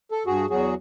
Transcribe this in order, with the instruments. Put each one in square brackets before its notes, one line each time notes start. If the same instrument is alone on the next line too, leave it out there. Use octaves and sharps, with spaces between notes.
[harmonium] A4
G2 F#4 G#4
E2 F#3 F#4 G#4